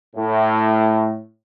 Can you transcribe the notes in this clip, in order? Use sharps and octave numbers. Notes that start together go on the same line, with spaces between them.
A2